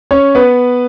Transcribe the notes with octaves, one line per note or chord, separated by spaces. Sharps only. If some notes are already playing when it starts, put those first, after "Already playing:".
C#4 C#5
B3 B4